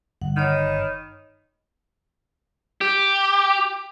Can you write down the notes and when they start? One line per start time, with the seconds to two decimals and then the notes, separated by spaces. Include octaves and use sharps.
0.22 G1 F#5
0.37 D#3 C#5 D#5 B5
2.81 G4